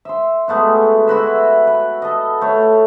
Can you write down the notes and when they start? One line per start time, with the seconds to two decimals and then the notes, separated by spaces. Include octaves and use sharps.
0.05 E5 C6
0.48 G#3 A3 B3 F#4
1.07 E4 F#4 B4 E5
1.67 B4
2.02 A4 D#5
2.41 A3 C#5